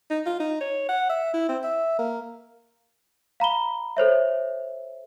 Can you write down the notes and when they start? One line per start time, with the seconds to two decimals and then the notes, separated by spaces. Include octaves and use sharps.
0.10 D#4
0.26 F4
0.40 D#4
0.60 C#5
0.89 F#5
1.09 E5
1.34 E4
1.48 C4
1.64 E5
1.99 A#3
3.40 F5 A#5 B5 G7
3.97 A4 C5 C#5 E5